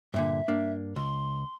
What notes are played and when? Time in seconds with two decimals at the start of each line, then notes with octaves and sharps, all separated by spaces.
0.14 G2 A#2 D3 E5
0.48 G2 A#3 D4
0.96 C#2 C6